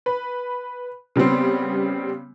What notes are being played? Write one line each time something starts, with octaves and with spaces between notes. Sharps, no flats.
B4
C#3 G3 B3 C4